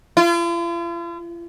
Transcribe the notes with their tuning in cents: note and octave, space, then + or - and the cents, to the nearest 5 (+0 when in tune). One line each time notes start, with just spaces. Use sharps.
F4 -45